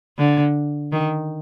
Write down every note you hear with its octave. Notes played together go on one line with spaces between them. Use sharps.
D3
D#3